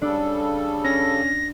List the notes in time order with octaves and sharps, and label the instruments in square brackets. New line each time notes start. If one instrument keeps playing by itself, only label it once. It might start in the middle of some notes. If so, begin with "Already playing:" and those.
[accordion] C#3 G3 A4 [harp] D4
[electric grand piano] C#4 [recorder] A#6